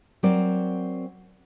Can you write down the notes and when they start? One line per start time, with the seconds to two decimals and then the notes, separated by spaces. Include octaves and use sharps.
0.23 F#3 C4 A#4 D5